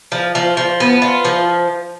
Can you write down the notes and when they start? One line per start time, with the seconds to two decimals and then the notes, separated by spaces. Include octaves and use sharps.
0.12 F3
0.35 F3
0.57 F3
0.80 B3
1.02 F4
1.25 F3